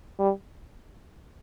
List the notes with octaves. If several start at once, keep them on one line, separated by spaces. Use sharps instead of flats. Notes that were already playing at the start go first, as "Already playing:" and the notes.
G3